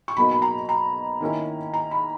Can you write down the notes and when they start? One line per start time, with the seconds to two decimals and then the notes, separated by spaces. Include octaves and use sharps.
0.08 C#6
0.16 B2 F#3 A#3 D#4 B5
0.31 B5
0.42 A#5
0.69 A#5
1.21 D#3 A#3 C#4 E4
1.74 A#5
1.91 B5